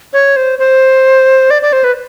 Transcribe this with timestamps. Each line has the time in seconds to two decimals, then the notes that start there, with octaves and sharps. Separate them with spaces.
0.13 C#5
0.36 C5
0.59 C5
1.50 D5
1.62 D5
1.73 C5
1.84 B4